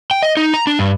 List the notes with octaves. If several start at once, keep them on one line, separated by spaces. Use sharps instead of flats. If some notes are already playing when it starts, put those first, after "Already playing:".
G5
D#5
D#4
A#5
D4
G2